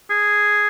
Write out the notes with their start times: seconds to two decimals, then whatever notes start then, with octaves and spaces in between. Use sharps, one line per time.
0.10 G#4